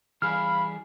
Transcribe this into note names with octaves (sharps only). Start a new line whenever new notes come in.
E3 G3 G#4 F5 B5 F6